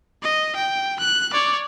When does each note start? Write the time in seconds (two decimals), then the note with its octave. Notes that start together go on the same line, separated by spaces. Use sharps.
0.23 D#5
0.56 G5
1.00 F#6
1.33 C#5 D5